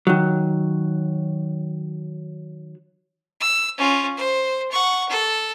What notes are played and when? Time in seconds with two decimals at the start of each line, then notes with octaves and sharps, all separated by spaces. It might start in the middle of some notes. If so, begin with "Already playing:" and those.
0.07 D#3 F#3
3.40 E6
3.77 C#4 F4
4.17 C5
4.72 F#5 C#6
5.09 A4